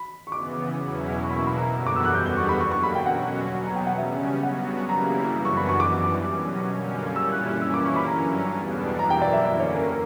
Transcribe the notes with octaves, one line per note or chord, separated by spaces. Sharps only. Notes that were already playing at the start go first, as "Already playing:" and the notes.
Already playing: B5
C#6
C#3 E3 B3 D6
E2 B2 F#3 C#4 E4
B2 A#3 E4 C#6
B5
C#6
B5
A#5
F#2 D3 G3 B3 F#4
D6
E6
F#6
E2 D3 G3 B3 F#4 G6
G6
C#6
B5
D3 F#3 A#3 C#6
C#6
B5
G5
B2 F#3 C#4 F#4 F#5
B2 F#3 B3
A#5
G5
F#5
C#3 G3 C#4 E5
G2 F#3 B3 F#4 F#5
C#3 G3 A#3 E4 A#5
F#2 E3 B3 D4 F#4
C#6
B5
C#6
F#2 E3 G3 D6
B2 F#3 C#4
F#2 D3 G3 A#3 C#4
A#2 G3 C#4 E4 E6
F#6
F#6
E3 A#3 C#4 E4 E6
D6
C#6
B5
G2 D3 F#3 C#4 A#5
E2 B2 G3 B3 D4
F#2 E3 A#3 E4 A#5
G5
D5
E5
D3 A#3 C#4 D5
C#5
A#4
A#4